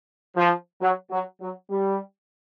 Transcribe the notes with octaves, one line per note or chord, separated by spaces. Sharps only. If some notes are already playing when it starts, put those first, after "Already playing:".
F3
F#3
F#3
F#3
G3